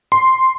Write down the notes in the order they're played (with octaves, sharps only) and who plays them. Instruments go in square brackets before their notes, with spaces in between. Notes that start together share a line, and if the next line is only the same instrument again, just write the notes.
[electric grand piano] C6